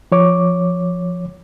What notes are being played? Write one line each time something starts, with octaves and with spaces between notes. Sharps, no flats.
F3 C#5 D6